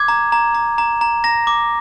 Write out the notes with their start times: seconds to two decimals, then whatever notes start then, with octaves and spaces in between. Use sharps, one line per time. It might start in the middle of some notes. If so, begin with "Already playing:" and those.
Already playing: D6 G#6
0.08 A#5
0.32 A#5
0.54 A#5
0.78 A#5
1.01 A#5
1.24 A#5 A#6
1.47 D6